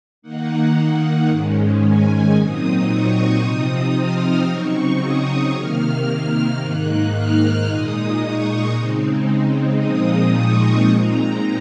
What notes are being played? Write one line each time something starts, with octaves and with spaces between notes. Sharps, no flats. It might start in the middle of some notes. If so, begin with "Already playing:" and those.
D#3 A#3 D#4 F#5
G#2 D#3 G#3 C#4
G#5
A#2 F#3 C4 D#4 D#6
C#6
C3 F3 C4 D#4 D#6
F6
C#3 F#3 C4 D#4 C#6
D#6
C3 D#3 A#3 F6
G#2 D#3 A#3 D#4 F#6
F6
A#2 G#3 D#4 D#6
C#6
C#3 G#3 C4 D#4
A#2 F3 G#3 C4 D#4 D#6
C#6
A#2 G#3 C4 D#4 A#5